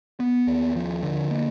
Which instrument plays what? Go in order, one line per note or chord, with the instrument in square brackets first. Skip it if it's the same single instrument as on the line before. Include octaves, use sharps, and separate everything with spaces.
[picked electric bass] B3
D#2
F3
D3
A#3